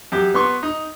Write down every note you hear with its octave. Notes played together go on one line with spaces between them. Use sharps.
F#2 G4
B3 C6 C#6
D#4